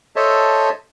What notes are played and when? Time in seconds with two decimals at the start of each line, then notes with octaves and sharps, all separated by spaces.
0.16 A4 C5 C#5 D#5 E5 A5